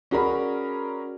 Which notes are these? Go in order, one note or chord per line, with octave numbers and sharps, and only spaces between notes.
C#4 F#4 G#4 A#4 D5 B5